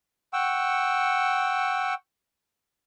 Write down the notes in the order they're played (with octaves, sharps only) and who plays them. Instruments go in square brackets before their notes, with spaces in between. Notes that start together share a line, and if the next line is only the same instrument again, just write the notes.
[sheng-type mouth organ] F#5 G5 C#6 E6